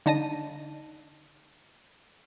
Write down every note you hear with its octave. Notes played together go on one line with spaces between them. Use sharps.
D3 D#4 A5 A#6 D#7